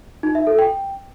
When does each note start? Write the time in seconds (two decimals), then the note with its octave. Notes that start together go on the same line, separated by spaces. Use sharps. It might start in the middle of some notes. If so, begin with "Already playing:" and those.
0.23 D#4
0.35 E5
0.47 A4
0.59 G5